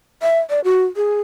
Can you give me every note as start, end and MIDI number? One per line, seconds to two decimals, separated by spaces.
0.22 0.39 76
0.50 0.60 74
0.64 0.84 66
0.96 1.21 68